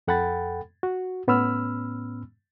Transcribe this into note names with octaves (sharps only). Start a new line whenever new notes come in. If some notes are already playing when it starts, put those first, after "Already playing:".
F2 A4 F#5 G5 B5 A6
F#4
A2 B3 C#4 B5 E6 F6